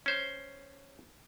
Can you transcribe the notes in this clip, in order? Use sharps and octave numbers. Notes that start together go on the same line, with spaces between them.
C#4 C5